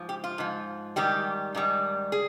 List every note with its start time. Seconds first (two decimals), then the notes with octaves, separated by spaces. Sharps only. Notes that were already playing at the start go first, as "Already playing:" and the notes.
Already playing: G#2 F3
0.09 G4
0.24 F4
0.38 G#2 F3
0.96 G#2 D#3 G3 G4
1.55 G#2 D#3 G3
2.12 G#4